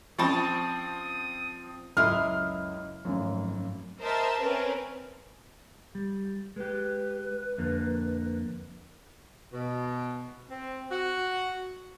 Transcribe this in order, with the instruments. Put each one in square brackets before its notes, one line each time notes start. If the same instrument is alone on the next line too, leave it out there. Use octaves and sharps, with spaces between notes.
[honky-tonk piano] F3 C4 [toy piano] C#4 B5 C#6 [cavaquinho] D5 A5 [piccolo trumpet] D#6
[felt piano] C#2 F#2 [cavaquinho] E4 C6 D#6 [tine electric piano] D#5 [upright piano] F6
[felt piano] G#1 F#2 [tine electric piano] F3 A3 C#4
[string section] A#4 C5 D#5 E5 A5
C4 C#4 A#4 B4
[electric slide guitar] G3
[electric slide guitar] G#3 G4 [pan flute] B4
[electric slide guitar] F2 D3 A#3
[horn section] B2
C4
F#4